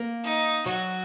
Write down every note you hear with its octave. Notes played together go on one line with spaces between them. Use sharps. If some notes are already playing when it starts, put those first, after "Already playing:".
Already playing: A#3
D#4
F#3 F#4